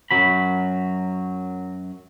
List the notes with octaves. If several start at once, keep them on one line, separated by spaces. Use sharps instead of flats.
F#2 F#3 B5